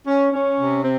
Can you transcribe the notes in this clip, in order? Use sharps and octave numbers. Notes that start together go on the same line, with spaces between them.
C#4
C#4
C3
C4